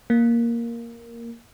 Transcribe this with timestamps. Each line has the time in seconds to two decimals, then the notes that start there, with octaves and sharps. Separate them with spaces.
0.10 A#3